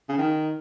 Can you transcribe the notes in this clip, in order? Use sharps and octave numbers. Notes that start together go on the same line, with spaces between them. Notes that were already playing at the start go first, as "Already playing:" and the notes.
C#3
D#3